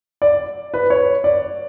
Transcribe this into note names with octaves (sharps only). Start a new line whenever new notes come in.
D5
B4
C#5
D5